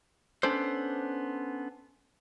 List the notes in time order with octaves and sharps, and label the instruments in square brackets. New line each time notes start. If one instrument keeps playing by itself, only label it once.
[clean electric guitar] B3 C#4 D4 A4 C5